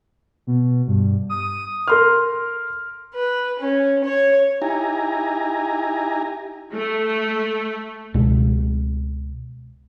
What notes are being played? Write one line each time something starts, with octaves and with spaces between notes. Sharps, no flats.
B2
G2
D#6
A#4 C6 F6
B4
C#4
C#5
D#4 E4 G4 G#5 A#5
A3
C#2 B2 G#3